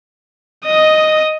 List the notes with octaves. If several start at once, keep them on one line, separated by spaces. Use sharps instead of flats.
D#5 D#6